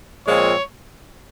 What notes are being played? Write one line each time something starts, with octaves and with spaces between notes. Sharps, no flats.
A#2 F3 G#3 C4 C#5